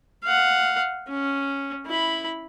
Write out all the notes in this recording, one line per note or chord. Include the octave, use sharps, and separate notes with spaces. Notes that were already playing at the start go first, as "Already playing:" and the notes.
F5 F#5
C#4
E4 B5